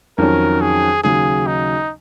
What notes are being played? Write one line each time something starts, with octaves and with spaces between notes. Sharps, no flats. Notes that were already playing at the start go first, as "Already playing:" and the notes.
F2 D#3 F#3 C#4 A#4
G#4
D#2 C#3 F#3 G#4
D#4